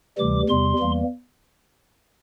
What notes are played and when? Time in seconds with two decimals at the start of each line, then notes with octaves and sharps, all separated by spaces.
0.18 D2 C3 E3 G3 D6
0.49 E2 C3 G3 C6
0.79 E2 E3 G3 A#3